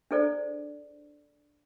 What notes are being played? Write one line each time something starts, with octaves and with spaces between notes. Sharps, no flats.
D4 E4 G#4 A4 C5 D5